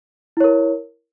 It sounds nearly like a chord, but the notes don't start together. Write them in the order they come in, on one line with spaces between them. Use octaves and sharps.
E4 C#5 A#4